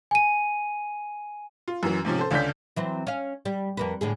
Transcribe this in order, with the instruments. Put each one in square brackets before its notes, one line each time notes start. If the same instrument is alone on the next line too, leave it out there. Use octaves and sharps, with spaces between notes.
[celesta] G#5 D#7
[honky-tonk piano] F4
F#2 E3 F#3
G#2 C3 F3 C#4
A4 C5
C#2 D3 C#4 D4 G6 B6
[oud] E3 F#3 C4
C#4 F5
G3
F2 A#3 B4
A2 D3 G#4